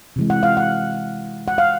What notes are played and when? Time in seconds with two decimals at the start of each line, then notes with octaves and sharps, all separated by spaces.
0.16 C3 E3 G#3
0.30 F#5
0.43 F5
0.57 F#5
1.48 F#5
1.58 F5